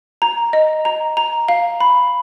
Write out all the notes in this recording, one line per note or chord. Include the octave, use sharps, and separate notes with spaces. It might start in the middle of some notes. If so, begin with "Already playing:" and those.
A#5
D#5
A#5
A#5
F5
B5